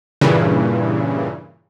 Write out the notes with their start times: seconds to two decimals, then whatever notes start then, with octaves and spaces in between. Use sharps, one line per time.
0.21 G2 A#2 C#3 E3